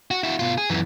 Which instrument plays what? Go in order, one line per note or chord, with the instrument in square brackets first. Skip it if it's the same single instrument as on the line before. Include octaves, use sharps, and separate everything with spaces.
[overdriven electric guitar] F#4
E4 F#4
B2 F4
G#4
F#2 E3